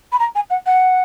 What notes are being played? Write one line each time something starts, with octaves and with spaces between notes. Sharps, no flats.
B5
A#5
G#5
F#5
F#5